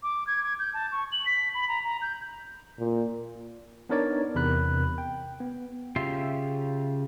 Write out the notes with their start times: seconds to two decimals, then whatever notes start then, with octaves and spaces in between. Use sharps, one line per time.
0.03 D6
0.27 G#6
0.44 G#6
0.59 G6
0.74 A5
0.92 C#6
1.12 F#7
1.26 B6
1.55 B5
1.68 A#5
1.84 A#5
2.02 G6
2.79 A#2
3.89 B3 D4 D#4 A#4 C#5 D5
4.35 E2 C3 A#4 B5 F#6
4.98 G5
5.40 B3
5.96 C#3 F4 G4 E5 C6